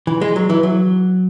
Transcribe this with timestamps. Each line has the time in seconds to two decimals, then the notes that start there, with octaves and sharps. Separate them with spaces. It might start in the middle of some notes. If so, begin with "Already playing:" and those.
0.07 E3
0.21 G#3
0.36 F#3
0.50 E3
0.63 F#3